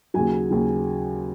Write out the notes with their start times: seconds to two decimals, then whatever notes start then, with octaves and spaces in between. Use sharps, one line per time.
0.14 D#2 C#3 F#3 G#5
0.51 D#2 C#3 F#3